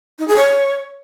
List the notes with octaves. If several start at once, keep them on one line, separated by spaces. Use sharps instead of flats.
D#4
G#4
C#5